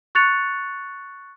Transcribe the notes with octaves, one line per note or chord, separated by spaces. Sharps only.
C#6 F#6 A6 C#7 F7